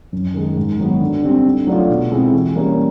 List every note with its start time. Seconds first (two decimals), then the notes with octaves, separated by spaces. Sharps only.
0.13 F#2
0.34 D#3 G#3
0.57 G#2
0.78 D#3 F#3 B3
1.01 D3
1.23 G3 C4
1.45 D3
1.67 F#3 A3 D4 F4
1.90 B2
2.12 G#3 C4 E4 G#4
2.33 E3
2.55 G3 A#3 C#4